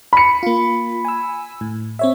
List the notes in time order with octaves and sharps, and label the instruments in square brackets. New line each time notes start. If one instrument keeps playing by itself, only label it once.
[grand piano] B5 C#7
[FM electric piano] A#3 F4
G#5 E6
A2
C4 C#5 E5